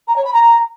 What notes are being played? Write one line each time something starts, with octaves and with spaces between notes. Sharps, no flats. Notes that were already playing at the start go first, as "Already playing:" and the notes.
A#5
C#5
B5
A#5